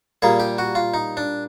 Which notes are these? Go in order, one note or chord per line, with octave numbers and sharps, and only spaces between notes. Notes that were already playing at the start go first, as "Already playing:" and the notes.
A#2 G3 A#3 G#4
G4
F#4
F4
D#4
D4